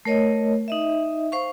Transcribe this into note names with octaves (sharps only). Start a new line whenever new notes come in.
A3 A#4 C#5 D#5
D#4 D#5 E5
C5 F5 C#6